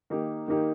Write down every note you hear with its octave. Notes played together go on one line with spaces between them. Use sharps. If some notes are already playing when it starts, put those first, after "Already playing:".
D#3 A#3 D#4 G4
D#3 A#3 D#4 G4